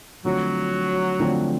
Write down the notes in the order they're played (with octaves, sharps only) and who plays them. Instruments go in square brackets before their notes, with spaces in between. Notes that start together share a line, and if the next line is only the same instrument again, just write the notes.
[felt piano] D3 F3 A3 C4 [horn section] F#3
[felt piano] D3 F3 A3 C4